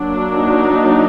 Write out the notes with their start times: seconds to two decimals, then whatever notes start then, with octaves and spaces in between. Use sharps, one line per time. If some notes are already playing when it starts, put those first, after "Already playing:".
Already playing: F#3 A#3 D4
0.34 D#4